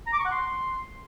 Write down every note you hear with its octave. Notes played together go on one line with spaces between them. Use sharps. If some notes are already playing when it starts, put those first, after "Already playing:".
A#5
D6
C#6
F#5
C6